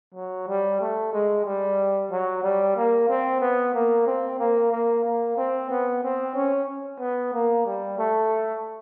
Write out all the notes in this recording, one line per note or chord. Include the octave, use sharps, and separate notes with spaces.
F#3
G3
A3
G#3
G3
F#3
G3
A#3
C4
B3
A#3
C4
A#3
A#3
A#3
C4
B3
C4
C#4
B3
A#3
G3
A3